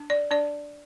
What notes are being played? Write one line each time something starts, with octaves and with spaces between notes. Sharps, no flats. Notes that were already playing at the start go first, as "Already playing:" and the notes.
Already playing: D4
D5
D4 D5